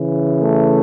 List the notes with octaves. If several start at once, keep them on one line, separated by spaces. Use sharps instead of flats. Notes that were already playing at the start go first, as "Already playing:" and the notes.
Already playing: C#3 E3
A3